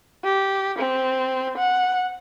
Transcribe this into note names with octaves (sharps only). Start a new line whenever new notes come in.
G4
C4
F#5